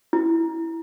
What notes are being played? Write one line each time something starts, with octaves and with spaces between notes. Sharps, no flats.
E4